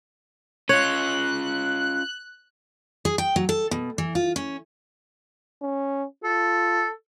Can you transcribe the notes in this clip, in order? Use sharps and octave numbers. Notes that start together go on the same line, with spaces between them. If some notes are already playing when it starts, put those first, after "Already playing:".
C#4 F4 C#5 F#6
G#4
G5
F#3
A4
B2
E3
F4
C#4
C#4
F4 A4